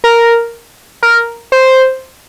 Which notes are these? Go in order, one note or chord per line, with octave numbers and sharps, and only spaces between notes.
A#4
A#4
C5